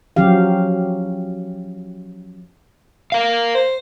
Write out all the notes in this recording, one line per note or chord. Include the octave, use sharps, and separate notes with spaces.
F3 F#3 C#4 G4 F5
A#4 F5
C5